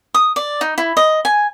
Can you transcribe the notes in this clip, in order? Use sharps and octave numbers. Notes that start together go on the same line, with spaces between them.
D#6
D5
D#4
E4
D#5
G#5